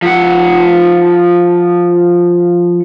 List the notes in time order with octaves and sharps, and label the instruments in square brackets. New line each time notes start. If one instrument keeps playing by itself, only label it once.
[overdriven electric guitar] F3 F#5